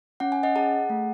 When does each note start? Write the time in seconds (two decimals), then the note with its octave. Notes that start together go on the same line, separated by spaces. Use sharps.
0.20 C#4 F#5
0.32 G#5
0.43 D#5 F#5
0.56 G#4 F#5 A5
0.90 A3